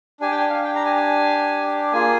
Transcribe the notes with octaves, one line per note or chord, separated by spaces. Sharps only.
D4 G4 G#5
G5
G#5
F5
G5
A#5
G#5
G#5
A#3 F4 G#4 G#5